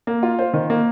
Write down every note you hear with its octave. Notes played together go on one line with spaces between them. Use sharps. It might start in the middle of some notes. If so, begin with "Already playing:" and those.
A#3
F4
C5
D#3
A#3